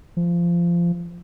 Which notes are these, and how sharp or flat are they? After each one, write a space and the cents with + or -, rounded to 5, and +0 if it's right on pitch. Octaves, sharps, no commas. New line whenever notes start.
F3 -20